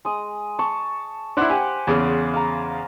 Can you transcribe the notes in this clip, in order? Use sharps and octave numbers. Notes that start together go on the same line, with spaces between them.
G#3 D#6
A5 C#6
D4 E4 C5 F#5 D6
G4 G#5
E2 C#3
F5 A#5